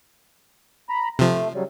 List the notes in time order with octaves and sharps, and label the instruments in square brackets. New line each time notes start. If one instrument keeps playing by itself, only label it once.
[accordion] A#5 B5
[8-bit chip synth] C3 F3 [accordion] A3
[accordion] C#3 F#3 G3